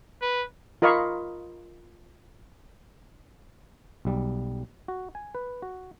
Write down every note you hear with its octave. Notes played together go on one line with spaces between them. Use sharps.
B4
F4 A#4 D#5 F5 B5 C#6
B1 G3
F#4
G#5
B4
F#4